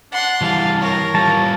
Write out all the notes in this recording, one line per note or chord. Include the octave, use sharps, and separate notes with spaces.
D4 F#5 C6
E3 G3 F5 A5
A#4 C#5
G3 F4 A5